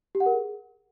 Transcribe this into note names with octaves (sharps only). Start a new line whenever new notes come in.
G4
F#5
A#4
G#4